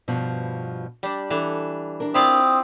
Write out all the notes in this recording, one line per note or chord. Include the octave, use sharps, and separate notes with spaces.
G2 B2 F3
G3 D4
E3 D4 A4
D4 A#4
C4 E4 F4 D5 D#6